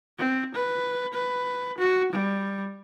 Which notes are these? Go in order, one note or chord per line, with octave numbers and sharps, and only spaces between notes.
C4
B4
B4
F#4
G3